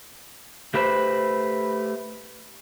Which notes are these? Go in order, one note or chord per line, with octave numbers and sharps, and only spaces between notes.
A3 G4 B4 C5